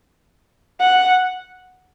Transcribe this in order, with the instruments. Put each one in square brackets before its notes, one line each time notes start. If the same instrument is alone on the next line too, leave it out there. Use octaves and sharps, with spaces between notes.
[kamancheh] F#5